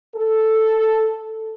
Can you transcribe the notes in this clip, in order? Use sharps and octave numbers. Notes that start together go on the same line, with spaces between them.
A4